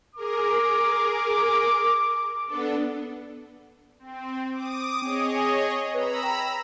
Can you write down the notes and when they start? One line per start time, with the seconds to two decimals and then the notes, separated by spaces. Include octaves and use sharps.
0.15 G#4 A#4 D6
2.47 B3 D4 A4
3.99 C4
4.52 D6 D#6
5.02 C4 G#4 C#5 D#5
5.94 B4 A#5 B5 E6
6.23 G5